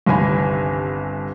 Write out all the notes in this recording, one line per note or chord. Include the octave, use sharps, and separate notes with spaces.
G1 C2 D#3 G#5 B5